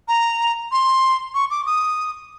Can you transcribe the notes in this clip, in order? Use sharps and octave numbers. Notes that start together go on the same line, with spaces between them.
A#5
C6
C#6
D6
D#6